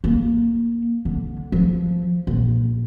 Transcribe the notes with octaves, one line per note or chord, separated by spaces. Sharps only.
A#3
D3
F3
A#1